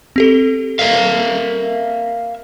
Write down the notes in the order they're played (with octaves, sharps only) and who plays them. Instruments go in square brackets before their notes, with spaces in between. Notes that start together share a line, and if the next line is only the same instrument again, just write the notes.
[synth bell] C4 G4 A4
[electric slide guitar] A#4 E5 F5